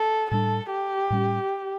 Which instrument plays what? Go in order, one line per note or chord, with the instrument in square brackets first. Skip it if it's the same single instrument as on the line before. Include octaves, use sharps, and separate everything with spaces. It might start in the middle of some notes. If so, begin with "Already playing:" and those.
Already playing: [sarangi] A4
[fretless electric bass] A2 G3 D4 [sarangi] A4
[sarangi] G4
[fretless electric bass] A2 G3 C#4